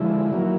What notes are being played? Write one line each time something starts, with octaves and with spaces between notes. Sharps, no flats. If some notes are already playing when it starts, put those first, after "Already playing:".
Already playing: D3 F3 G#3 E4
D#3 F#3 A#3